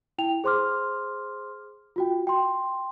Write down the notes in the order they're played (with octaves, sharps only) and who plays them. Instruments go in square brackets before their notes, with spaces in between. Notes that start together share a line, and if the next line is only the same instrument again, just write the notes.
[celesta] E4 G5 F7
G#4 C5 C6 D6 F6
F4 F#4 G5
G5 C6